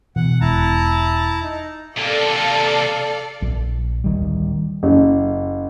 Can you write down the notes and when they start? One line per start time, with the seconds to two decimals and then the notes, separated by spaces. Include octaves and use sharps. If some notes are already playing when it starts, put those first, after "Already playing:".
0.16 B2 E3 F#5
0.41 E1 E4 A5 A#5
1.43 D#4
1.98 C3 A#3 A4 D5 F5
3.42 A#1
4.04 D1 D#3 G3
4.83 F#1